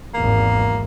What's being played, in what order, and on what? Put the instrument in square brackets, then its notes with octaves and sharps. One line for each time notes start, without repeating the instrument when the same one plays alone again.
[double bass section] G#1 E2 [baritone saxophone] A#3